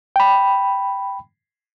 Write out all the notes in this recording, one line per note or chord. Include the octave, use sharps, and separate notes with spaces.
G5 B5